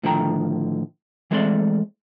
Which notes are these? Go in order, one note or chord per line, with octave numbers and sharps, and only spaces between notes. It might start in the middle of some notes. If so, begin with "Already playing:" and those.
A2 D3 D#3 F3 G5 A#5
E3 G#3 A3 C4 D5 C6